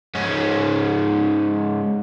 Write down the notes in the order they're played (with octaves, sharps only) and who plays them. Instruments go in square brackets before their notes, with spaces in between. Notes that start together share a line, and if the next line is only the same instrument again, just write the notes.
[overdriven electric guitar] G#2 C#4